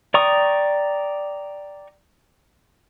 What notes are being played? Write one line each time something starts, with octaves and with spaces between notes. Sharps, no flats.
D5 G5 A#5 C#6 D#6